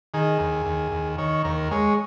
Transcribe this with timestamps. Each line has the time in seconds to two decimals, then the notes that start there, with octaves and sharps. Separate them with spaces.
0.14 D#3 G#4
0.40 D#2
0.66 D#2
0.92 D#2
1.18 D#3 C#5
1.45 D#2 A#4
1.71 G#3 C#5